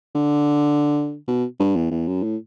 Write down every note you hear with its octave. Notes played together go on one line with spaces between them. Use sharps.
D3
B2
G2
E2
E2
F#2
A2